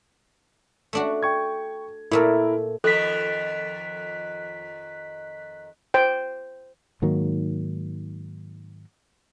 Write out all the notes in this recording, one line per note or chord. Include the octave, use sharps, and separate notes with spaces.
A3 D4 F#4
G5 C#6 G#6
A#2 A3 E4 A4 A#4
F2 D#3 A4 F#6 B6
C5 G5
G#2 D#3 F#3 A#3